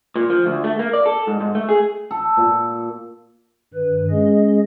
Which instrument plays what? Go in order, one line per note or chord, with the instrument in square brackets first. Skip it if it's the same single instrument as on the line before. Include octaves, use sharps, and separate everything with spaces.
[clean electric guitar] A#2
F3
D2
A3
A#3
D5
A4
G#2
G#2
A3
G#4
[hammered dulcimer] A4
A#2
[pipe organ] G2 D#3 B4
G#3 C#4 G#4 D#5